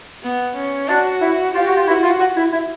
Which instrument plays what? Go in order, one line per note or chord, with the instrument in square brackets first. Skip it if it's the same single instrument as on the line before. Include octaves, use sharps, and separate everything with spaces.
[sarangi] B3
C#4
[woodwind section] D4 [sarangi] F#4
[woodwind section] E4
[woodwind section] F4 [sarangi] G4
[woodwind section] F#4
F4
[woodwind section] E4 [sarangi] F#4
[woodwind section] F4
F#4
E4
E4